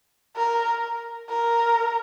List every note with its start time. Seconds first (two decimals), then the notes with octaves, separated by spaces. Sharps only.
0.36 A#4
1.30 A#4